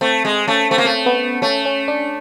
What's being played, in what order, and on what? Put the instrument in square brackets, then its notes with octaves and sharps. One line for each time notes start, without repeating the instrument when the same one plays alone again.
[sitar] A3 [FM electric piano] C4
[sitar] G#3
[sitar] A3 [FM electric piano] C#4
[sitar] A3 [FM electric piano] C4
[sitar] A#3
A3
[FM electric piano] B3
[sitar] A3 [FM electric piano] C#4
[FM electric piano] C#4
D4